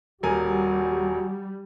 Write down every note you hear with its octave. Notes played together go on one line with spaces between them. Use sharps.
D#1 G3 F#4 A#4 G#5